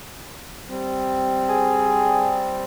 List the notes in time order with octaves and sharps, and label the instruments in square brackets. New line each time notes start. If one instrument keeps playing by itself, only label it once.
[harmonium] G3 C4
[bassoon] G#4